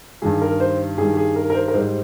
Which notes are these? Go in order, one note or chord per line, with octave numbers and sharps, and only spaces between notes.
G2 D#3 G3 G#4
A#4
C5
G2 D#3 G3 G#4
G#4
A#4
A#4
C5
A#4
G#2 G3 C5